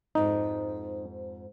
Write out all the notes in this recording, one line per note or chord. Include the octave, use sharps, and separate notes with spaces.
F2 G#2 D#4 G4